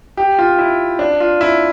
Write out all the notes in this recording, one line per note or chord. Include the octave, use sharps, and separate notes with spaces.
G4
F4
E4
D4
F4
E4